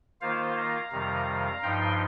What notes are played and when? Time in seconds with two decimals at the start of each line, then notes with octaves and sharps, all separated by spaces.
0.21 D#3 A#3 F4 C5 F5
0.57 F5 A#5
0.92 F2 C3 D#3 G3
1.63 G2 F3 D#4 G5 C6